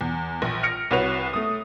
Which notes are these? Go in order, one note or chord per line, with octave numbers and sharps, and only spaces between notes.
E2
A#1
F6 A#6 C#7 D7
C2 F#4 B4 C#5 F7
A3 D#6